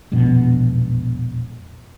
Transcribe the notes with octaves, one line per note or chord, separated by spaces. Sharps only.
E1 A#1 F2 B2